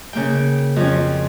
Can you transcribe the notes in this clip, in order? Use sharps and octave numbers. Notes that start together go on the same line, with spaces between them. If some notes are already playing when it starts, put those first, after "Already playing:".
C#3 A#3 G5
F2 F3 C#4